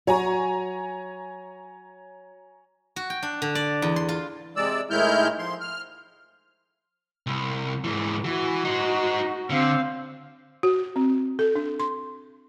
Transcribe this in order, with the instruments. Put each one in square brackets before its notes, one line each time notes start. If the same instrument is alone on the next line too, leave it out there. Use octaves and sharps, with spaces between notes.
[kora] F#3 [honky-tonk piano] C#5 G#5 A#5
[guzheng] F#4
G5
D4
D3
D5
E2
C6
F4
[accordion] C3 G#3 D5 E6
A2 D#3 G#3 E4 F6 G6
F3 C6
F6
[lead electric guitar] C2
G#2 E3
[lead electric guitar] E3 [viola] F#4
[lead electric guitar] D#4 C5
[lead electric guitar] D3 [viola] C4 F5
[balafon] F#4
C4
A4
D4
C6